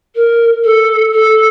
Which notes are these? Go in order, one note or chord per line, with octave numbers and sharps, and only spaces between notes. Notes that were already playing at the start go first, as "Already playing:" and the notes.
A#4
A4
A4